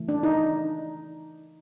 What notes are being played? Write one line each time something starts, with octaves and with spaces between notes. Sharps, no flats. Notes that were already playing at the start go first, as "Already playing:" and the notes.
Already playing: C#3 E3 A3
D4
D#4